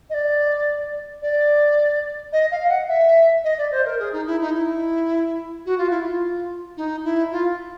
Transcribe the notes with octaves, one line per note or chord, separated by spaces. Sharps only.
D#5
D5
D5
D#5
F5
F#5
E5
D#5
D5
C5
A#4
G#4
D#4
E4
D#4
E4
F#4
F4
E4
F4
D#4
E4
F4